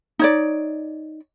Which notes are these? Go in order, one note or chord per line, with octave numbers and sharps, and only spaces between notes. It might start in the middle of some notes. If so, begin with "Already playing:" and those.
D#4 C#5 D5